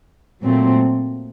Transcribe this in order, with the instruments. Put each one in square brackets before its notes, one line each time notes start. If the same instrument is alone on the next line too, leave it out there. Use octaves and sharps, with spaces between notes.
[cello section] A#2 F#3 A3 C4